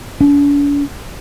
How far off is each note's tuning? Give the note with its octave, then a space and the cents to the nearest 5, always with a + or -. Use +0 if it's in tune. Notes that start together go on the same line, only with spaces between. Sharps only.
D4 -45